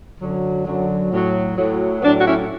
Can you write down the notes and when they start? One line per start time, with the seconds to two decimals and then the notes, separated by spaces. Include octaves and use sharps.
0.19 F#2 D3 F#3
0.65 F#2 D3 F#3
1.11 A2 F#3
1.57 A2 F#3
2.02 A2 F#3 B3 D4
2.19 F#4
2.25 C#4 E4